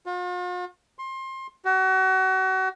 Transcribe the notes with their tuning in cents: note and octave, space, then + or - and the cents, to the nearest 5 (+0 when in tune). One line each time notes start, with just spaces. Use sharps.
F4 +45
C6 +25
F#4 +35